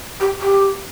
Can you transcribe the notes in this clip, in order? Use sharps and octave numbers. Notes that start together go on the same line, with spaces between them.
G4
G4